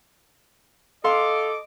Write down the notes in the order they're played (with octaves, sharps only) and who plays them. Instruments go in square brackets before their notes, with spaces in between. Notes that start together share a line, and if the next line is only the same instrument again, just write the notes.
[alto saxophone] A4 [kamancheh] D#5 D6 [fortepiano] F5 C6